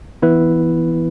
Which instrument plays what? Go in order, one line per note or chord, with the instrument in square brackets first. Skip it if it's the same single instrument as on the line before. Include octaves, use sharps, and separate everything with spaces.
[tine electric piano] E3 B3 E4 B4